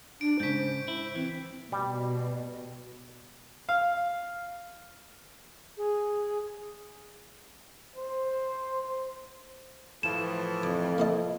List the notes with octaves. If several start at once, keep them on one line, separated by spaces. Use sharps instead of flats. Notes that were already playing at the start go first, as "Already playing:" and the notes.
D4 D7
G#2 C#3 C5 G6 B6
E4
E3 C4
B2 G3
F5
G#4
C5
A2 E3 F3 E7
F2 D6
A#3 E4 D#5